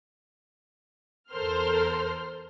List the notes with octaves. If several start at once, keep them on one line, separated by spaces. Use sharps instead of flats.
E2 A4 A#4 C5 C6 F6